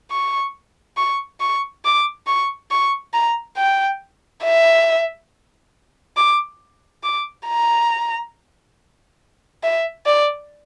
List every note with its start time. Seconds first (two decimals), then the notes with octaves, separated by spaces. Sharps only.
0.11 C#6
0.97 C#6
1.40 C#6
1.85 D6
2.27 C#6
2.71 C#6
3.14 A#5
3.57 G5
4.44 E5
6.17 D6
7.03 D6
7.47 A#5
9.63 E5
10.06 D5